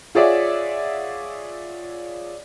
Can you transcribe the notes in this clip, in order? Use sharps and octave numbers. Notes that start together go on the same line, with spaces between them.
F4 G#4 C#5 D5 E5 F#5